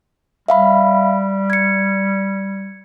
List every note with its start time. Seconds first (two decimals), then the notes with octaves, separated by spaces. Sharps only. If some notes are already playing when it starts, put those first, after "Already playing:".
0.48 G3 E5 F5 B5
1.50 G#6 C#7